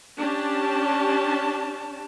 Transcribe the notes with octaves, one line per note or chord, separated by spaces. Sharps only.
C#4 D4 G4 A5